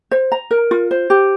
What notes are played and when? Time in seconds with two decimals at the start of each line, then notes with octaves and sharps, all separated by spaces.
0.11 C5
0.32 A#5
0.51 A#4
0.71 F4
0.91 C5
1.10 G4